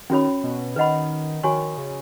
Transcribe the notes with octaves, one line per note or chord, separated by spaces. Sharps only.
D#3 C#4 F#4 C#5 B5
B2
D#3 B4 D#5 F#5 B5
D#3 F#4 C#5 G#5 C#6
C#3